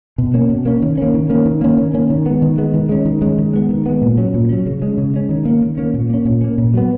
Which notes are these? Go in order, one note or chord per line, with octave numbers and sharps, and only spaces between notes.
B2
A#3 C#4
B2
A#3 C#4
D#3
A#3 C#4
D#3
A#3 C#4
D#3
A#3 C#4
D#3
A#3 C#4
D#3
G#3 B3
D#3
G#3 B3
D#3
G#3 C#4
D#3
G#3 C#4
D#3
G#3 B3
D#3
G#3 B3
A#2
F#3 C#4
A#2
F#3 C#4
C#3
G#3 C#4
C#3
G#3 C#4
D#3
A#3 C#4
D#3
A#3 C#4
A#2
A#3 C#4
A#2
A#3 C#4
A#2
F#3 B3